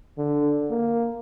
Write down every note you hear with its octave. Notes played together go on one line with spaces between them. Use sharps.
D3
A#3